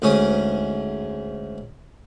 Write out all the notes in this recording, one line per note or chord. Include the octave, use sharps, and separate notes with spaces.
D2 G#2 C#4 D#6